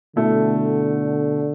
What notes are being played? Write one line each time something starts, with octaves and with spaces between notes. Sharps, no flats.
B2 D3 A3 E4